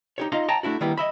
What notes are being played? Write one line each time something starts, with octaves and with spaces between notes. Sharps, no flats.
D#4 G4 C#5
D#4 F4 D#5 F5 A#5
C#5 G5 A5 A#5
A3 D4 E4 F#4
D#3 G3 A#3 B3 E4
D#5 E5 B5